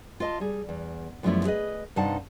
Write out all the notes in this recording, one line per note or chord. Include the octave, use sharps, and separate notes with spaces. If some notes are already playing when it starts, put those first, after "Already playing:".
F4 D#5 A5
G3 G#4
E2
F#2 F3 G3 A3 B3 E4
G#4 B4 D#5
G2 C3 D#4 F5 F#5 A5